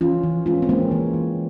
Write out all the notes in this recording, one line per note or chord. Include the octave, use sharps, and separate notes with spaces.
E3 C#4 F4
E3
G#3 C#4 F4
C4
G#3 A#3 C#4
E3 C4
E3